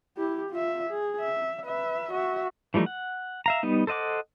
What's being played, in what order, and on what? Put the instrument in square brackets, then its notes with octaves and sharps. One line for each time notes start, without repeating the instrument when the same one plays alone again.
[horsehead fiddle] E4 G4
F4 E5
G#4
E5
B4 E5
F#4 E5
[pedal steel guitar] E3 F3 G3 A3 D#4
F#5
E5 F5 A#5
G3 B3 D#4
A4 C5 D#5 F#5 D6